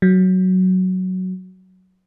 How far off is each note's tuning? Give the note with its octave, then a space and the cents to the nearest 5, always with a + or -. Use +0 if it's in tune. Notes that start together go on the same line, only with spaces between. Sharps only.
F#3 +5